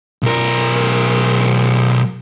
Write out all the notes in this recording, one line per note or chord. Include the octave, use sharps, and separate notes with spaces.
B1 A#4